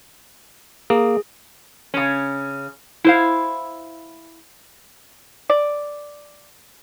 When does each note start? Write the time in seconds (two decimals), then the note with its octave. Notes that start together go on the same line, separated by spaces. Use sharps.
0.90 A#3 G#4
1.94 C#3 C#4
3.04 E4 C5 F5
5.50 D5